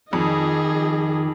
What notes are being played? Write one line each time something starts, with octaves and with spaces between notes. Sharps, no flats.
F2 D#3 G#4 D#5